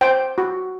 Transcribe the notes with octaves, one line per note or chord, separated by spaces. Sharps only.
C5 G5
F#4